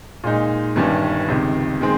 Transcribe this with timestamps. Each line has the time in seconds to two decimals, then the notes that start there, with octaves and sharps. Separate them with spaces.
0.24 A#2 G#3 D#4
0.75 G1 G2 D#3 G3 C#4
1.28 C#2 C3 D#3
1.81 D#3 G#3 C4